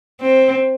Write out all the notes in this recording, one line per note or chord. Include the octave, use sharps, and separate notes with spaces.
C4